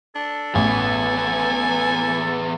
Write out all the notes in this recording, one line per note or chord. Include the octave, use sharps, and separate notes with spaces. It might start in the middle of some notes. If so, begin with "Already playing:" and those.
D4 A4
A1 E2 B3 G#5